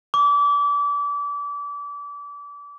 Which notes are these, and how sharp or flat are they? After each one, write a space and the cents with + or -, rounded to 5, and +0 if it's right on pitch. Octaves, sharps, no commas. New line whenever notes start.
D6 -30